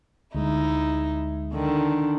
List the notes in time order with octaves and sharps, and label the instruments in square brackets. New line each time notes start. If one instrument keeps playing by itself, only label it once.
[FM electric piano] D2 G#3 [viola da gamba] D#4 E4
[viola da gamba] D3 D#3